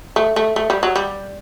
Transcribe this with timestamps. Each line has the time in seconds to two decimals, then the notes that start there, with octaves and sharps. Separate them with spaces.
0.16 A3
0.36 A3
0.56 A3
0.70 G3
0.83 F#3
0.96 G3